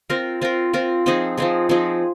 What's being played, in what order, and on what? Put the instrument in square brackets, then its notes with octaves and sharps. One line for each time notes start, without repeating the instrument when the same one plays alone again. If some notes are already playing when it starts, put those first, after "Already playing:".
[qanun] C4 F4 A#4
C4 F4 A#4
C4 F4 A#4
F3 C4 D#4 G#4
F3 C4 D#4 G#4
F3 C4 D#4 G#4